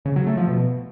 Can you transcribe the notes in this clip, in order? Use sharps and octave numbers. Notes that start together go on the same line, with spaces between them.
C#3
F#3
A3
F3
B2